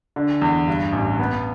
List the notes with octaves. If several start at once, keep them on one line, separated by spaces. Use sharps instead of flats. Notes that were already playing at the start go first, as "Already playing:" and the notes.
D3
E2
G2
A1
B3